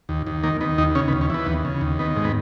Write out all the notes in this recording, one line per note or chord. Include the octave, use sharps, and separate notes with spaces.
D#2
D#2
D#3 A#3
D#3 B3
D#2 D#4
C#3 C#4
B3
D#2
C#4
E3 B3
D#2
C#3
D#2
D#3 B3
G#2
B3